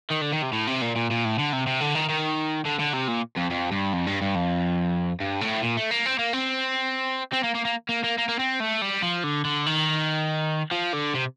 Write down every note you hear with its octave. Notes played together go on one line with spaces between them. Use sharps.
D#3
D3
D#3
C3
A2
C3
A#2
A#2
A#2
A2
D3
C3
C3
D3
D#3
D#3
D3
D3
C3
A#2
F2
F2
G2
F2
G2
G2
F2
G2
A2
A#2
A3
A#3
C4
A#3
C4
C4
A#3
A#3
A#3
A#3
A#3
A#3
A#3
C4
A3
G3
F3
D3
D3
D#3
F3
D3
C3